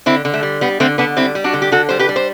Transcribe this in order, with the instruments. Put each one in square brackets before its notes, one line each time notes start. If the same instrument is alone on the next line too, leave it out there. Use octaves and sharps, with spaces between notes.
[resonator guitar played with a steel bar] D3 C4 E4
D3
A3
G3
G3 B3
D3 A3 C4
D3 B3 D4
G3 C4 E4
G3
D4 F#4
D3
G4
D3 F#4 A4
G3 C5
G4 B4
G3
C5